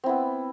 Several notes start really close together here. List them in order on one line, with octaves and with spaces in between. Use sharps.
C4 E4 B3